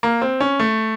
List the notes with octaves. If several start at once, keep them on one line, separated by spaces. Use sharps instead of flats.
A#3
C4
C#4
A3